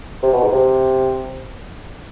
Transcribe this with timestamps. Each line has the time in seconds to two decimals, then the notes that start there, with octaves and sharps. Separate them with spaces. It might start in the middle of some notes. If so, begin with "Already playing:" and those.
0.23 C3
0.33 B2
0.43 G#2
0.52 C3